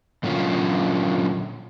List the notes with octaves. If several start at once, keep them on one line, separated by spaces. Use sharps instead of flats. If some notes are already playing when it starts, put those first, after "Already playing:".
A#2 D3 F#3 A#3 C#4 F4